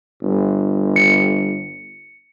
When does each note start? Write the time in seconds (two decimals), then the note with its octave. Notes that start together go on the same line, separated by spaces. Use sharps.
0.22 G1
0.96 C#7